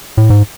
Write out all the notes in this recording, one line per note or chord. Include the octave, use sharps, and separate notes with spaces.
A2
G#2